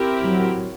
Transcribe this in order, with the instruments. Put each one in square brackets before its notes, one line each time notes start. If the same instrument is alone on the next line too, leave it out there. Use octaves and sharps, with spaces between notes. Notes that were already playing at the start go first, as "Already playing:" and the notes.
Already playing: [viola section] C4 E4 G4 A#4
[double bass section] F#3